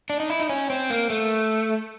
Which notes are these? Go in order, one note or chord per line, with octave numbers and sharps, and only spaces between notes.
D4
D#4
E4
D#4
C#4
C4
A#3
A3